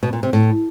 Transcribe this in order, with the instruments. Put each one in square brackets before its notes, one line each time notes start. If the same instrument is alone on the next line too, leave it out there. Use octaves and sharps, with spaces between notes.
[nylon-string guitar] B2
A#2
C3
A2